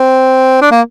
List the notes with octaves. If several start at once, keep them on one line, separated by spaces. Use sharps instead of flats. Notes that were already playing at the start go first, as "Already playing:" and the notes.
Already playing: C4
D4
A#3